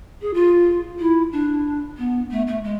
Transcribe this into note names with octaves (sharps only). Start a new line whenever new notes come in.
G#4
F4
E4
D4
B3
A3
A3
G#3